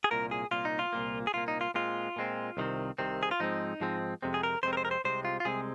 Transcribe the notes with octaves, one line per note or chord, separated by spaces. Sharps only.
G#4
C2 A#2 A#3 A#4
G#4
C2 A#2 A#3 F4
D#4
F4
C2 A#2 A#3
G#4
C2 A#2 A#3 F4
D#4
F4
A#2 G#3 C4 F4
A#2 G#3 C4
C2 C3 D#3 C4
C2 C3 D#3 C4
G#4
F4
G#2 F3 G#3 C4 D#4
G#2 F3 G#3 C4
F2 C3 G#3 C4
G#4
A#4
F2 C3 G#3 C4 C5
A#4
C5
A#4
C5
C2 C3 G#3 C4 C5
F4
F4
C2 C3 G#3 C4 G#4